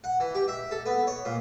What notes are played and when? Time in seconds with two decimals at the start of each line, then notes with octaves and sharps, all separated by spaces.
0.04 F#5
0.20 E3
0.35 G4
0.48 E5
0.71 A4
0.86 B3
1.07 C#5
1.25 A#2